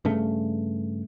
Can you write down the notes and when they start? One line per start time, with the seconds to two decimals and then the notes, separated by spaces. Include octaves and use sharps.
0.05 G2 C#3 A3